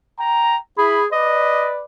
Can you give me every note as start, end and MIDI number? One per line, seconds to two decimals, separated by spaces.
0.20 0.58 79
0.20 0.58 82
0.78 1.01 64
0.78 1.07 68
0.78 1.01 83
1.13 1.84 71
1.13 1.84 74
1.13 1.69 75